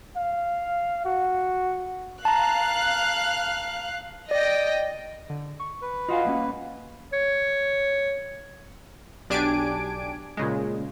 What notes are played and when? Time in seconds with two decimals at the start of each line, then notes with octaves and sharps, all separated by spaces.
0.16 F5
1.05 F#4
2.25 F5 A5 A#5 F#6
4.31 D5 D#5 G5
5.29 D3
5.60 C#6
5.82 B4
6.09 F4 F#4 D#5 F5 F#5 G#5
6.25 G3 A#3 C#4
7.13 C#5
9.30 B1 D4 G4 G#5 D6 D7
10.37 A#2 C#3 G#3